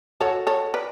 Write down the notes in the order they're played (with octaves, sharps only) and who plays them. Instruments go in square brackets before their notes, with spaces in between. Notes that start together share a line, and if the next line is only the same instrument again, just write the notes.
[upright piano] F#4 [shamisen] A4 C#5
[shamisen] A4 C#5
B4 D5